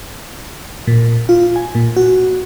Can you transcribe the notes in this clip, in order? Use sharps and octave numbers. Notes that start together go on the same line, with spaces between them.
A#2
F4
G#5
A#2
F#4